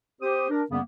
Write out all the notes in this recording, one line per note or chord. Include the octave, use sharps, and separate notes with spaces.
C4 G4 C5 D#6
D4 A#4
F#2 C#3 G3 A#3 B3